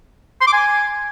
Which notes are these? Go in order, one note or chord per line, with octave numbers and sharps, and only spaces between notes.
C6
D6
G#5